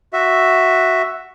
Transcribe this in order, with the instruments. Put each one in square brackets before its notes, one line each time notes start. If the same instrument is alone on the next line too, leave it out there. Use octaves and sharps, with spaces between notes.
[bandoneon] F#4 E5